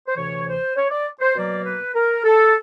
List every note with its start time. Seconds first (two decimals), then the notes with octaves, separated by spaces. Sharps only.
0.08 C5
0.16 D2 C3 E3 C#5
0.47 C5
0.76 C#5
0.90 D5
1.20 C5
1.35 B2 F#3 A#3 D5
1.64 B4
1.94 A#4
2.24 A4